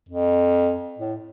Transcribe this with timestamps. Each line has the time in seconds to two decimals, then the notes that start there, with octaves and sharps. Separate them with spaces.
0.09 F2
0.98 A2